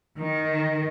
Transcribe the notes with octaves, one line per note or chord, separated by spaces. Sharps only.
D#3